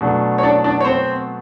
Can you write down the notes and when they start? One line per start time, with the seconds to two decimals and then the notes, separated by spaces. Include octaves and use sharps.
0.01 B2 F#3 A3 D4
0.38 C#5
0.43 D4 D5
0.64 D4 D5
0.81 C#5
0.85 C4 C5